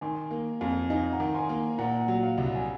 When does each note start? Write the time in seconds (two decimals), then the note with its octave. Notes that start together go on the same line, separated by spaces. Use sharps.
0.01 D#3 G#5 C6
0.31 A#3
0.61 F2 F5 G#5
0.90 D#4 F5 G#5
1.12 F#5 A#5
1.20 D#3
1.34 G#5 C6
1.49 A#3
1.78 A#2 F#5 A#5
2.01 F#5
2.08 F#3
2.23 F5
2.38 C2
2.45 F#5
2.55 G#5